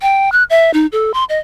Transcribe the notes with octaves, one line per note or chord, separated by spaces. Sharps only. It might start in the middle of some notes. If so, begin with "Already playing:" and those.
G5
F#6
E5
D#4
A4
C6
D#5